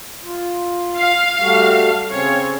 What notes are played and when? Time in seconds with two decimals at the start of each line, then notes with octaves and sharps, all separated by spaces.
0.24 F4
0.97 F5
1.40 G3 A3 F#4
2.12 C#3 C4 C#4 C#5